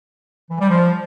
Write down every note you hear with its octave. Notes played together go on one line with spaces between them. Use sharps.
E3
G3
F3